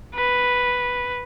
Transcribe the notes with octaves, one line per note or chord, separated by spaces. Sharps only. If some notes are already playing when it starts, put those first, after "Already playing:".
B4